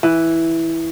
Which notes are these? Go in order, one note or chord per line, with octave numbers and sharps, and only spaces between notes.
E3